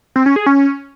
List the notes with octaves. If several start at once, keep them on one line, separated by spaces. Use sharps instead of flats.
C4
C#4
G#4
C#4